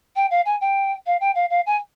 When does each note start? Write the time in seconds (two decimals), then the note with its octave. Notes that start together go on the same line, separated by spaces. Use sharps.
0.16 G5
0.31 F5
0.46 G#5
0.61 G5
1.06 F5
1.21 G5
1.35 F5
1.50 F5
1.66 G#5